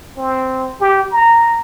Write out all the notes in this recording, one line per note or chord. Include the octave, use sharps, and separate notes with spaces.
C4
G4
A#5